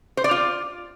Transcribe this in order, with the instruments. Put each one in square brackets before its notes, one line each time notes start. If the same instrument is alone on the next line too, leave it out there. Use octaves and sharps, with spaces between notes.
[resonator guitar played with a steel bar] C5
D5
F4